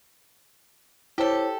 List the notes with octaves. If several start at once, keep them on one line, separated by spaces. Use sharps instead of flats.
E4 G4 A4 C5 C#5